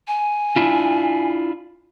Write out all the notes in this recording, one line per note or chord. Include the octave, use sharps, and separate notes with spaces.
G#5
D4 E4 F4